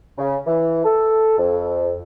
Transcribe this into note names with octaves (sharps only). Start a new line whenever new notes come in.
C#3
E3
A4
F2